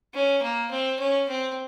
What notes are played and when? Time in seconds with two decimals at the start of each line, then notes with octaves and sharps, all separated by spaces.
0.14 C#4
0.42 A#3
0.71 C4
1.00 C#4
1.29 C4